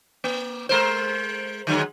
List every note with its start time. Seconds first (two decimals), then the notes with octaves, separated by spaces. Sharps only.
0.24 A#3
0.69 G#3 A#4 C5
1.67 D3 F#3 G#3